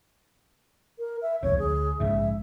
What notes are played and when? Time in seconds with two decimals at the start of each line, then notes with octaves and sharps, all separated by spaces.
0.99 A#4
1.22 E5
1.43 D#1 C2 F2 C#5
1.59 D2 G#4
2.00 A#1 G#2 C#3 E5